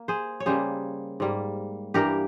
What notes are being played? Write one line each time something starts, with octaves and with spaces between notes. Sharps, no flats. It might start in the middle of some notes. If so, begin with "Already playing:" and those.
Already playing: A#3
G#4 C5
C#5
C#3 G3 A#3 G#4 C5
G#2 G3 A#3
G2 E3 A#3 G4 A#4